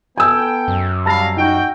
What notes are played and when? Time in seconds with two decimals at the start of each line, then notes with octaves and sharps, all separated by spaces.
0.17 B3 A4 G5 G#5 E6
0.68 F#2
1.06 G3 F5 A5 B5 A#6
1.37 D#4 F#4 G5